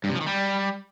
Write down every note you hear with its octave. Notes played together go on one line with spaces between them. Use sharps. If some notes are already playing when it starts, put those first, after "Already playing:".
G2
C3
F3
D#3
G3